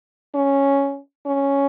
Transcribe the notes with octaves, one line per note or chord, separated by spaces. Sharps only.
C#4
C#4